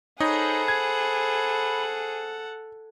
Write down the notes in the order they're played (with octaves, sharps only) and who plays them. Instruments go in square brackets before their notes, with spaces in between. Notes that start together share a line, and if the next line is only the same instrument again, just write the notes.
[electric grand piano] D#4 C#5 D#5 [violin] G#4 C5 [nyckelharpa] A4 F#5 [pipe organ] B5
[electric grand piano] G#6